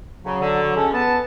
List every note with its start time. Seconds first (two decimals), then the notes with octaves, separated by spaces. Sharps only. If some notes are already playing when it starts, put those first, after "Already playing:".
0.25 C#3 F#3
0.41 D3
0.63 F#3
0.76 G#3 C#4 A4
0.93 B3 A5